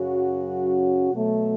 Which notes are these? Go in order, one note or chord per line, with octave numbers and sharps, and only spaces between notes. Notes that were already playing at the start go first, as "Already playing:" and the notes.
Already playing: F#2 C#3 F#3 C#4 F#4
B2 F#3 A3